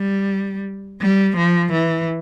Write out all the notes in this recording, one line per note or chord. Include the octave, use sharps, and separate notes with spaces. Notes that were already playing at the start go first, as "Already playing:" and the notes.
Already playing: G3
G3
F3
E3